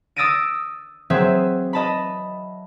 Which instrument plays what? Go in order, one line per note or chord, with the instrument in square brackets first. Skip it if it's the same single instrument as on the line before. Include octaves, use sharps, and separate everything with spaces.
[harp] D#6 E6 A6 A#6 D7 D#7
F#3 C4 G#4 E5
D#5 A5 B5